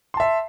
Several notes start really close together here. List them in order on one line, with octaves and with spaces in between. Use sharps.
C6 A5 E5